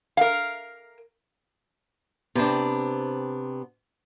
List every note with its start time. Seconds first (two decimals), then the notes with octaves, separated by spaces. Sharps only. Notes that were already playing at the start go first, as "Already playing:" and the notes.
0.17 A#4 F5
2.35 C3 B3 C4 D4